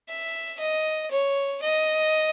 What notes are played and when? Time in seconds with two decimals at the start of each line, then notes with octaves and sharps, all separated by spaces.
0.09 E5
0.59 D#5
1.10 C#5
1.62 D#5